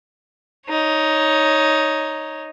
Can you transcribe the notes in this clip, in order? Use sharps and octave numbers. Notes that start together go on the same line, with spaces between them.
D#4 C#5